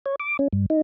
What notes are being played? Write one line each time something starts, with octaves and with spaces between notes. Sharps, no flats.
C#5
D6
C#4
G2
D#4